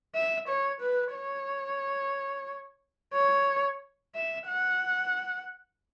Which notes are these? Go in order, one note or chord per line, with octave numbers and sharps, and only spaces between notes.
E5
C#5
B4
C#5
C#5
E5
F#5